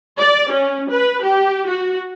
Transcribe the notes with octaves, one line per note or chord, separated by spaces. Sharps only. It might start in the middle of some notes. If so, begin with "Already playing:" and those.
D5
C#4
B4
G4
F#4